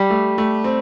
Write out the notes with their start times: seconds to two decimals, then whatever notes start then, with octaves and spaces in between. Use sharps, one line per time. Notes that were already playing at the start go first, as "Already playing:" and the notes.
Already playing: G3 G4
0.10 A3
0.38 A3
0.64 C4